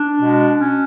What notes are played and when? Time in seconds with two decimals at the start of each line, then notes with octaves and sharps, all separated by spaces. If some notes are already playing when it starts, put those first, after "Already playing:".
Already playing: D4
0.22 B2 G#3
0.59 C#4